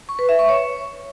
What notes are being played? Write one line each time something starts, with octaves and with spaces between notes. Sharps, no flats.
C#6
B4
E5
C#6
C#5